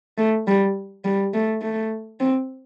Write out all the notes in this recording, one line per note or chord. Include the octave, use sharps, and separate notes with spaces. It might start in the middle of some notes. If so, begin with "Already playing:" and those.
A3
G3
G3
A3
A3
C4